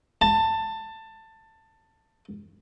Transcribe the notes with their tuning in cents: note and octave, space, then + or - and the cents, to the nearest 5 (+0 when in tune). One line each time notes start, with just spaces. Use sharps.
A5 +15